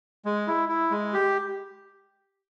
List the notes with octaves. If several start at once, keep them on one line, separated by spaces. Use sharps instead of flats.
G#3
E4
E4
G#3
G4